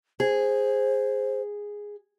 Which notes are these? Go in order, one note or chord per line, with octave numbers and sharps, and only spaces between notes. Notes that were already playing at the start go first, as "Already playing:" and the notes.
G#4 C5